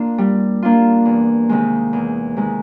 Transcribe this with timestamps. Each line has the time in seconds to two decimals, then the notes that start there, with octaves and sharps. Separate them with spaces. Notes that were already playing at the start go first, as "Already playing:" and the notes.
Already playing: A#3 D4 F4
0.18 G3
0.62 A#3 D4 F4
1.05 E2
1.49 C3 D#3 G#3
1.93 E2
2.37 C3 D#3 G#3